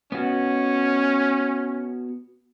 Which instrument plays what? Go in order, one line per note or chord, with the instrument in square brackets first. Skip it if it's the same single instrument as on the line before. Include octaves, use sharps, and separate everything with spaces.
[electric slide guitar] B3 F#4 [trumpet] C#4